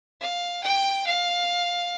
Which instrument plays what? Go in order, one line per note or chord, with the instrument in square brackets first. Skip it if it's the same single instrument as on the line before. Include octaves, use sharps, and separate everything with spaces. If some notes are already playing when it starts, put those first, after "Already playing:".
[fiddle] F5
G5
F5